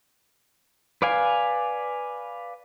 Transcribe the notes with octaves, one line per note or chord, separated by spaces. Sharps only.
B4 D5 F5 G#5